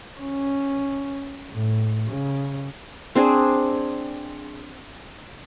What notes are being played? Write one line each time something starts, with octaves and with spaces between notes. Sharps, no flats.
C#4
A2
C#3
C4 D4 G#4